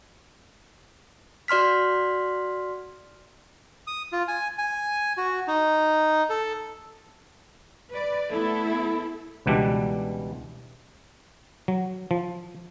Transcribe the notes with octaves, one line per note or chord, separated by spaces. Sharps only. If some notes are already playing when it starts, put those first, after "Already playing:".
F#4 D5 C6 F6 B6
D#6
F4
G#5
G#5
F#4
D#4
A4
B4 D5
A3 B3 E4 A4
C#2 B2 E3 G3 D4
F#3
F3